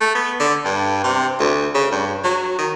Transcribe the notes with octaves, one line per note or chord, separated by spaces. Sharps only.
A3
B3
D3
G2
C3
D2
C#3
G2
F#3
D#3